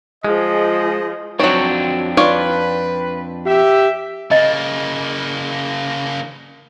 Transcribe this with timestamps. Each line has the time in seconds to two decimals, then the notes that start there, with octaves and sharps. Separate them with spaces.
0.25 F3 G#3 G#4 D#5
1.39 F2 F#3 C4 D4 C#5
2.17 F4 B4 C#5 D5
3.46 G4 E5
4.31 C#3 A#3 D#5